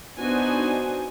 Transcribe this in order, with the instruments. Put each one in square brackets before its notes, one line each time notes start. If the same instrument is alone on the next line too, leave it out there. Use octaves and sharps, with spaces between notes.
[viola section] B3 D4 D#4 F#4 C5 G#5